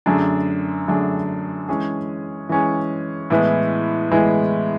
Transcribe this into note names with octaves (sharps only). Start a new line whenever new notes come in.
F#2 D3 A3 D4 G#4
F#2 D3 A3 D4 G#4
E3 G#3 C#4 G#4
E3 G#3 C#4 G#4
A2 E3 G#3 B3 E4
A2 E3 G#3 B3 E4